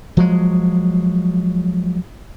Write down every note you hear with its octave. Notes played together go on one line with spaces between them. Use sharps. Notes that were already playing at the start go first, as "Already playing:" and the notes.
F3 F#3 G#3